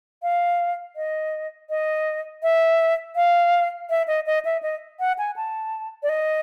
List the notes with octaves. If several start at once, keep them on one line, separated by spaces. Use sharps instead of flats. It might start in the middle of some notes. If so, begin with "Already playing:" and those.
F5
D#5
D#5
E5
F5
E5
D#5
D#5
E5
D#5
F#5
G#5
A5
D5
D#5